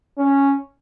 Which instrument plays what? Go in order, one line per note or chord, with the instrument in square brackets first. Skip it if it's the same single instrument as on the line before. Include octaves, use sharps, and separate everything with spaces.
[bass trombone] C#4